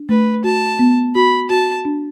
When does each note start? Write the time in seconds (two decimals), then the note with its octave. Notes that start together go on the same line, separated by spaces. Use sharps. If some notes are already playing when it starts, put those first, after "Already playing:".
Already playing: D4
0.09 A3 B4
0.44 F#4 A5
0.79 B3
1.15 F#4 B5
1.50 F#4 A5
1.85 D4